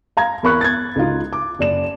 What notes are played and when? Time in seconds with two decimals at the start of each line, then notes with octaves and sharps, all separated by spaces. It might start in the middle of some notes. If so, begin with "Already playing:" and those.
0.17 F5 A#5 G#6
0.43 E2 A#4 B5 C#6 F#6
0.61 G#6 A6
0.96 C#2 D#4 F4
1.33 D6
1.59 F#1 D5 E7